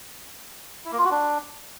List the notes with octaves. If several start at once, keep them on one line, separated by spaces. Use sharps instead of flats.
E4
A#3
F4
F#4
D4